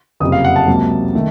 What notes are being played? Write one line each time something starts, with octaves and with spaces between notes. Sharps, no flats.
F#1 F2 C3 D#6
F5
F#5
A5
C#2 C3 F#3 A#3
D#3 A3